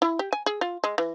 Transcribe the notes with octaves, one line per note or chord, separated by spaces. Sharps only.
E4
G4
G#5
G#4
F4
G#3
E3